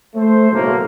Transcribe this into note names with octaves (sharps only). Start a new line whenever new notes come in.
A3 C5
F#1 B1 F#2 A2 G#3 A#3